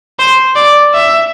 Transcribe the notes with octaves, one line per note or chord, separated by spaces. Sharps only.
C5
D5
E5